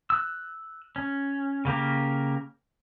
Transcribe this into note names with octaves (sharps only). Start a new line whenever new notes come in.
E6 F#6
C#4
C#3 A#3 G4 A#4